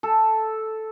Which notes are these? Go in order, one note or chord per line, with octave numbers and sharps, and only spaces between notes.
A4